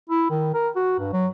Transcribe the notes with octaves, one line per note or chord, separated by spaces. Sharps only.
E4
D#3
A#4
F#4
G2
F#3